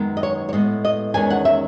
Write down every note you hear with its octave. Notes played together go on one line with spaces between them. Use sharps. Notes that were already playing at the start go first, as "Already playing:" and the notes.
Already playing: F#2 D#3 G#3 B3
D#5
C#5
C#5
A2 G#3 B3 D#5
D#5
E2 D#3 G#3 C#4 G#5
F#5
E5